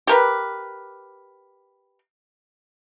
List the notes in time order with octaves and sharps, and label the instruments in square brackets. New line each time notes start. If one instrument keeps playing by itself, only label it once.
[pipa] G4 A#4 B4